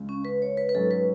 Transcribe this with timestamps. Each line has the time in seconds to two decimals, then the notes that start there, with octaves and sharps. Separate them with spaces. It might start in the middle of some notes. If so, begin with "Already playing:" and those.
Already playing: C#2 C#3 G#3
0.09 C#4
0.25 B4
0.42 C#5
0.57 B4
0.69 B4
0.74 G#2 F#3 C#4 A4
0.91 B4